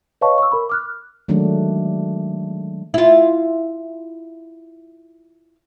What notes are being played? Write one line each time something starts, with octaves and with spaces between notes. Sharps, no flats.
B4 C#5 D#5 F5 A5 C#6
C#6 E6
A#4 B5
D6 F6 F#6
D#3 F#3 G#3 A3 D4
E4 F4